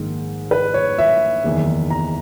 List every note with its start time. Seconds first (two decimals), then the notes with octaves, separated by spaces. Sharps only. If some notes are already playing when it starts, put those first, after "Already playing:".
Already playing: A#1 G#2 D#3
0.51 B4
0.74 C#5
0.99 E5
1.44 F#1 E2 D#3
1.90 A#5